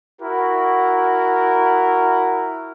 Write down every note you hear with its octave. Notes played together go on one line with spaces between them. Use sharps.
E4 F#4 A#4